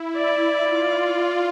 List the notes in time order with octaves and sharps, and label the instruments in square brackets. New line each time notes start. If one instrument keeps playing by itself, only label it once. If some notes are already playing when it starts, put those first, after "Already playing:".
Already playing: [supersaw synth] E4
[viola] D5
[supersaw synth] F4
F4